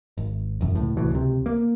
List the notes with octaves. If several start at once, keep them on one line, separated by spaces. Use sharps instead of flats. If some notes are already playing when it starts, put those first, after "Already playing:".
G#1
E1 F#2
C#2 A2
C2 A2 E3 F#3
C#2 C3
A#3